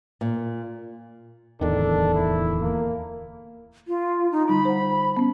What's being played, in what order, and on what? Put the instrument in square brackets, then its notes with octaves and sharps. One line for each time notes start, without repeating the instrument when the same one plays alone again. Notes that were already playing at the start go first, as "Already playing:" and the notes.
[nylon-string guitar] A#2
[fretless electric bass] D1 E2 D#3 [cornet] D4 [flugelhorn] A4
[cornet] E4
[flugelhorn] A#3
[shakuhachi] F4
D#4
[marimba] D3 G3 D#4 [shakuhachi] B5
[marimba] C5 F#5
B3 C#4